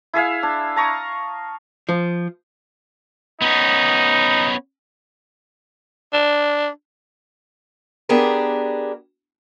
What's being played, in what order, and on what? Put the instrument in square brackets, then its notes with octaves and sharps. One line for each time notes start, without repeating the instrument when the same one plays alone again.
[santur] E4 G#4 E5 F5
D4
A5 A#5 C#6 D#6
[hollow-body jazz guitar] F3
[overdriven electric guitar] B3 C#4 [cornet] D#4
[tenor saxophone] D4
[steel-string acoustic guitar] B3 D4 G4 G#4 A#4